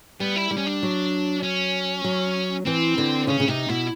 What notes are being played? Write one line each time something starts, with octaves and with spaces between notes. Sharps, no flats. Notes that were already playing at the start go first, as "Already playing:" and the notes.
G3 B3
E4
G3
C#4
D4
F#3
C#4
F#3
E3 C4
D3
C#3 C#4
C#3
C3 D#4
B2 E4